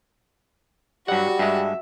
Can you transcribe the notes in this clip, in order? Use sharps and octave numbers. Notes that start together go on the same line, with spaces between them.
G2 F#3 G3 F#4 F#5
G2 G#3 E5